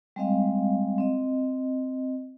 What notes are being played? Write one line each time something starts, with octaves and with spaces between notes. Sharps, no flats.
G3 G#3 C4 D#5 F5
C4 D#5